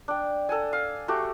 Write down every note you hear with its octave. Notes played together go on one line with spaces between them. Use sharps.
D4 G5
A4 F#5 G#5
F5
A3 F#4 G4